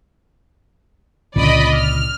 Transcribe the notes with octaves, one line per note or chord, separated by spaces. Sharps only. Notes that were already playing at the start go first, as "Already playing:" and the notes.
C#2 A#2 D3 D5 D#5 B5
F6